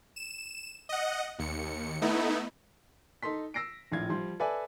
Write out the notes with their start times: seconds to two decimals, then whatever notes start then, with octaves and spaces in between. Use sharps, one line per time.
0.16 E7
0.89 D#5 F#5
1.39 D#2 C#7
2.02 A3 B3 D#4 E4
3.23 D#4 A4 C6 B6
3.54 E6 A#6 C7 D7
3.92 A#1 A2 F4 F5 G#6
4.10 F3 G3 C6
4.40 A4 B4 D5 E5 G#5